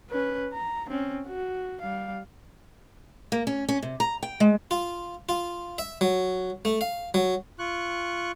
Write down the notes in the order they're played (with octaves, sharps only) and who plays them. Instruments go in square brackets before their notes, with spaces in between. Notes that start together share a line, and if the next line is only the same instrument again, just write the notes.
[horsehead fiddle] C#4 B4
A#5
C4 C#4
F#4
G3 F5
[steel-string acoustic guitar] A#3
C#4
C#4
C3
A#5
G5
G#3
[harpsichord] F4
F4
E5
F#3
A3
F5
F#3
[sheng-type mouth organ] F4 C#6 F#6